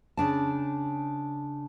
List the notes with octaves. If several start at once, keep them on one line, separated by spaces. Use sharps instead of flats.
C#3 D4 A5